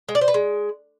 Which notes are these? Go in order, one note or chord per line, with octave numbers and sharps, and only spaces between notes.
G#3
D5
C5
B4
G#3